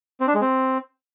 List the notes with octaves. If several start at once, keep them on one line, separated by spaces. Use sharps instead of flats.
C4
D4
G#3
C4